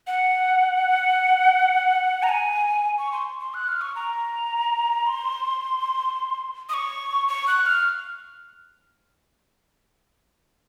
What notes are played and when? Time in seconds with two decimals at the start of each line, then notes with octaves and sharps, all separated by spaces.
0.07 F#5
2.23 A#5
2.29 G#5
2.98 C#6
3.12 C6
3.40 C6
3.54 F#6
3.68 F6
3.81 C#6
3.95 A#5
5.06 C6
6.69 D#6
6.74 C#6
7.28 C#6
7.47 F#6
7.66 F6